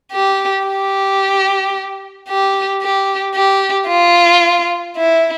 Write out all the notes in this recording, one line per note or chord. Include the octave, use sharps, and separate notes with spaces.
G4
G4
G4
G4
G4
F4
E4